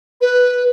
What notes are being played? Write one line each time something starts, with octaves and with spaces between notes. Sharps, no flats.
B4